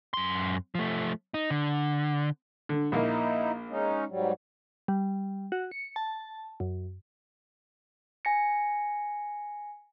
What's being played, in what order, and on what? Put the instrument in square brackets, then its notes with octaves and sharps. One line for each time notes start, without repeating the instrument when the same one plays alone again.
[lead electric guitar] F#2 C6
F3 A3
D#4
D3
[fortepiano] D3
[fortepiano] A#1 A#3 [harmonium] D#4 E4
[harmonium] G#3 C#4 D#4
G#2 F#3 G3
[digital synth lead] G3
F#4
C#7
A5
F#2
[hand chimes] G#5 A#6 C#7